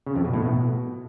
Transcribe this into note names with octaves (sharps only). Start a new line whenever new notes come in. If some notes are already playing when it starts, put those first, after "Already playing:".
C#3
F2
B2
A2
B2